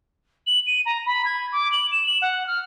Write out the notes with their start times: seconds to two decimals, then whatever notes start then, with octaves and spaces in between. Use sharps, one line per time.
0.47 F#7
0.67 D#7
0.86 A#5
1.06 B5
1.25 G#6
1.52 D6
1.72 F#7
1.92 E7
2.06 F#7
2.22 F#5
2.47 F6